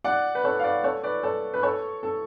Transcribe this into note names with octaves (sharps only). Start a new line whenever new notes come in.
D5 F#5
B4
A4 C#5
F5
B4 D5
A4 C#5
B4 D5
A4 C#5
B4
A4 C#5
A4